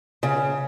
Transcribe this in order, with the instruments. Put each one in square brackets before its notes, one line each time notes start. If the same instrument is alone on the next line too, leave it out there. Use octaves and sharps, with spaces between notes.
[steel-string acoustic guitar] C#3